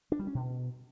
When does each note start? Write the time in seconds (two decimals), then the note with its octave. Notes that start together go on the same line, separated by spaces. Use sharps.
0.12 D4
0.19 G3
0.27 C#4
0.35 B2